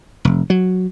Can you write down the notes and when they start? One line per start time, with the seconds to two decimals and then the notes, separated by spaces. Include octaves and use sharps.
0.25 F1
0.50 F#3